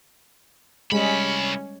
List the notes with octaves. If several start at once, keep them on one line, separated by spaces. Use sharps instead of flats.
C2 G3 G#3 C#4 B5